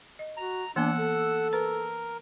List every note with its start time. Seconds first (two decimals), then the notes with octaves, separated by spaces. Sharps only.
0.19 D#5
0.37 F#4 A#5
0.76 E3 A#3 B3 D4 F#5 E6
0.99 A4
1.53 A#4 B4